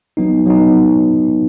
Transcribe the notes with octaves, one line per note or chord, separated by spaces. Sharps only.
F#3 B3 D#4
F#3 B3 D#4